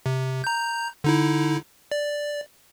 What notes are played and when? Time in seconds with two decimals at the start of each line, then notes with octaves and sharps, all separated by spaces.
0.06 C3
0.44 A#5 G6
1.04 D3 D#4 E4
1.92 D5